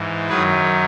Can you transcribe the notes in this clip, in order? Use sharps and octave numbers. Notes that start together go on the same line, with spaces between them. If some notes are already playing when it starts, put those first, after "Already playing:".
Already playing: G#2 E3
F#2 D#3 F#3 G#4 B4